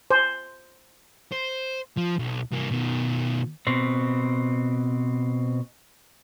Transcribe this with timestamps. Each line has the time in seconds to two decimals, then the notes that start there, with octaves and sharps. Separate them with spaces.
0.11 C5
1.32 C5
1.97 F3
2.19 B1
2.51 C2 A#3
2.70 B2 D#3
3.67 B2 C4